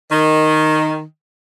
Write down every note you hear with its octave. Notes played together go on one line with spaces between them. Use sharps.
D#3